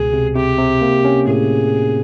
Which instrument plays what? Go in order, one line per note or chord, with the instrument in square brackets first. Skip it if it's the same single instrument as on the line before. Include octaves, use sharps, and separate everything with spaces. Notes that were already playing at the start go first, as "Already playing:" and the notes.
Already playing: [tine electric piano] C#2 B2 [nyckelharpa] G#4
[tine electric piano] C3
[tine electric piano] C3 [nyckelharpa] G4
[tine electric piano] C3
A#3
C#4
[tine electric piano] A2 [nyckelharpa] G#4